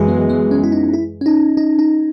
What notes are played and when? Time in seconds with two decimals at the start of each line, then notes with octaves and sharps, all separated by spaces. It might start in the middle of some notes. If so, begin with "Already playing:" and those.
Already playing: F#2 E3 G#3 F#4
0.08 B3
0.30 B3
0.51 C#4
0.64 E4
0.72 D#4
0.93 E4
1.21 C#4
1.26 D#4
1.57 D#4
1.79 D#4